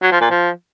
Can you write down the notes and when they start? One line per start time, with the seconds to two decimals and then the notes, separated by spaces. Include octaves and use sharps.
0.02 F#3
0.12 F3
0.21 A#2
0.31 F3